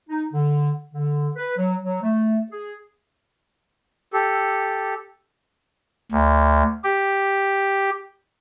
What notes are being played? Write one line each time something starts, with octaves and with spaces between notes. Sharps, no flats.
D#4
D3
D3
B4
F#3
F#3
A3
G#4
G4 A4
D2
G4